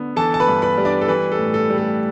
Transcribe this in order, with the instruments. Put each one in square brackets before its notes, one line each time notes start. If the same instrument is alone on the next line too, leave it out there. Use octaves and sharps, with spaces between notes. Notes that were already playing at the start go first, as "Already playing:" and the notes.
Already playing: [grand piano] D3 B3
E3 A4 A5
A5
B4 B5
G2
B4 B5
G3
D4 D5
A4
E3 B4
A4
A2
A4
G3
A4